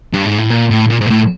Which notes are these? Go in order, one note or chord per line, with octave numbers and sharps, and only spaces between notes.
G2
G#2
A2
A#2
A2
A#2
G#2
A#2
A2